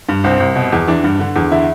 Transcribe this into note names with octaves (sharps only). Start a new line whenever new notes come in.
G2
C2 C4
C2
B2
E2
E3 D4
G2
D3
E2
D3 E4